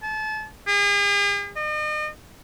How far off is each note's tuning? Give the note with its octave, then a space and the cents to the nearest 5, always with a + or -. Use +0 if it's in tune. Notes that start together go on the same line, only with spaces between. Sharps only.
A5 -30
G#4 -45
D#5 -40